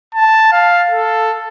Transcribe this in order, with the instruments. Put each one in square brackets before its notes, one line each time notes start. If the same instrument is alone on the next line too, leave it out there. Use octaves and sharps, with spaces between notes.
[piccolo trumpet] A5
F5
A4